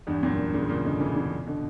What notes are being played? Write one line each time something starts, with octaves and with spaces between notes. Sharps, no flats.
E2 G2
F#2 A#2
A#2 C#3
A#2 C#3
B2 D3
C#3 E3
C#3 E3
B2 D3